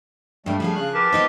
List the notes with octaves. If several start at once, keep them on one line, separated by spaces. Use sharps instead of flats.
G2 G3 A3 A#3
F3 G#4 F5
C#3 F#6
G4 A#4 B4 A5
B3 D#4 C5